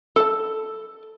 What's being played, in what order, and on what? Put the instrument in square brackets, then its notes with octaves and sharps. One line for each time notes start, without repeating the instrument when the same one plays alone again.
[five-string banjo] A4 A5